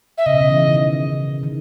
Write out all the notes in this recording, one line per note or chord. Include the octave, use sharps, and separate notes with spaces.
E5
C#3 D#5
B2
C#3
E3
D#3
C#3
C#3
D#3